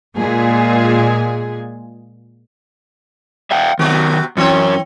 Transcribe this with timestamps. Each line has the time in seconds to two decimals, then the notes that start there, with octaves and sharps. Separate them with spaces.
0.17 A#2 G#3 G#4
3.51 E5 F5 G5
3.79 C3 D#3 F#3 B3 F#4
4.37 F#2 E3 C4 C#4 C#5